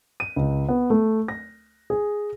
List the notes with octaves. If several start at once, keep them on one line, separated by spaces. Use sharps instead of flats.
D#7
C#2
B3
A3
A#6
G#4